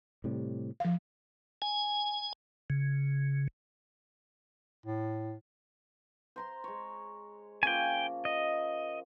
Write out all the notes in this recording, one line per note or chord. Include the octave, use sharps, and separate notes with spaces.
A2 C3 G3
F3 F5
G#5
C#3
A2
C5 A#5 C6
G#3 C#5
F3 A#3 C#4 G5 G#5
D#5